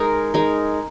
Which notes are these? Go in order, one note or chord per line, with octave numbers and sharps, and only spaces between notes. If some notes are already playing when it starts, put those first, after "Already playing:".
Already playing: G#3 D#4 A#4
G#3 D#4 A#4